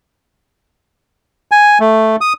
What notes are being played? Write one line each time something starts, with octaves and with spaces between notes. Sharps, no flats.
G#5
A3
D#6